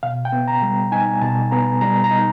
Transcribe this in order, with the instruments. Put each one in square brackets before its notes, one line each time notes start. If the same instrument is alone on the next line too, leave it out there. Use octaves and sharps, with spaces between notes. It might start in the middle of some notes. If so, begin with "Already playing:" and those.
[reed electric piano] B2 F5
G5
B3
A#5
G3
D#4 G#5
B2 A5
B3 A#5
G3 A#5
A#5
D#4